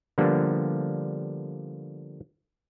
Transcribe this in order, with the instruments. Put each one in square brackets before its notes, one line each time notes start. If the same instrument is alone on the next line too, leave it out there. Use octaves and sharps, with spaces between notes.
[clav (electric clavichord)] D3 F3 G3 A#3 B3 D4